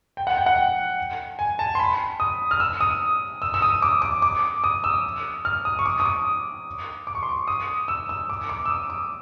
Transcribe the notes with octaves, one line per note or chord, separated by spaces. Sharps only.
G5
F#5
G5
F#5
G5
G#5
A5
C6
B5
D#6
F6
E6
D#6
E6
E6
D#6
D6
D6
D6
D#6
E6
F6
D#6
C#6
D6
D#6
D6
D6
C#6
C6
C#6
D#6
E6
E6
D6
D6
E6
D#6
D6